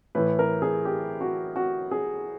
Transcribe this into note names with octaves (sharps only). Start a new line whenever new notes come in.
A2 E3 B4
A#4
G#4
G4
F#4
F#4
G#4